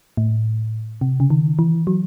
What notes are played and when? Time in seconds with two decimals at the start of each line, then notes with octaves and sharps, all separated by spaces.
0.17 A2
1.01 C3
1.20 C#3
1.30 D#3
1.59 E3
1.87 F#3